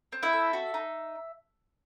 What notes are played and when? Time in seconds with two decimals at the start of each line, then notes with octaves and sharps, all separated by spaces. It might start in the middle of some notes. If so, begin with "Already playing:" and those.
0.12 C4
0.23 E4 E5
0.33 A4
0.53 F#4
0.74 D#4